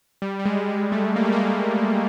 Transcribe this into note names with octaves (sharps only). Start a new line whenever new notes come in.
G3
G3
G#3
G#3
A3
A#3
A3
A#3